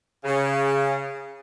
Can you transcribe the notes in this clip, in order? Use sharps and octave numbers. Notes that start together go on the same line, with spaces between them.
C#3